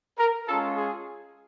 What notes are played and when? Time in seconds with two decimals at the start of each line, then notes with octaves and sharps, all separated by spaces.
0.18 A#4
0.48 G#3 C#4 F4 A4
0.77 G#4